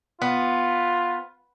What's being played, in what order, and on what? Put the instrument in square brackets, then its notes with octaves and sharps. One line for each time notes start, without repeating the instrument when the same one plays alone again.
[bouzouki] B3 [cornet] F4